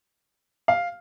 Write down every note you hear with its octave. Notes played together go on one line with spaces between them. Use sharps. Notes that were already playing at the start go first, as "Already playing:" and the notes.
F5